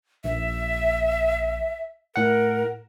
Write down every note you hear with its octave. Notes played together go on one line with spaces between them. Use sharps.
A#1 E5
A2 A#4 F#5